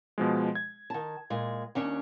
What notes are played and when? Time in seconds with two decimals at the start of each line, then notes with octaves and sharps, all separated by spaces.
0.18 B2 F3 G#3
0.55 G#6
0.90 D#3 A5
1.30 A#2 G#3
1.75 D#2 C#4 D4